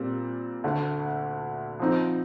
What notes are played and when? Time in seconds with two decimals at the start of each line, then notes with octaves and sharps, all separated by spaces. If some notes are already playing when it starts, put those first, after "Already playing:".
Already playing: A#2 G3 C4
0.64 D2 D3 A3
1.80 F3 C4 D#4